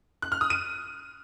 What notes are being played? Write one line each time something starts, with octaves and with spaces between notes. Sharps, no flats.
F#6
F6
D#6
D#7